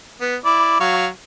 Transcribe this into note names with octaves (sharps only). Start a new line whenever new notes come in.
B3
E4 D5 D6
F#3 F5 C#6